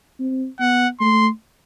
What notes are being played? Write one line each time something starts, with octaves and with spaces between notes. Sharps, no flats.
C4
B3 F#5
A3 C6